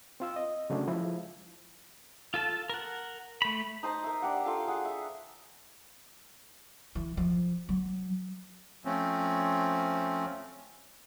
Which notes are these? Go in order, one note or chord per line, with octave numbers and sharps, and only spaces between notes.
C4 F4 E6
D#5
C#3 F#3 A3 C#4 D4
F3 G#3 E4
F4 A4 A5
A#4 F#5
A3 B5
D#4 C5 A5 A#5
A#4 E5
D4 G4 F#5
F4 A4 F5
G#4 F#5
E5
E3
F3
F#3
F3 A3 C4 C#4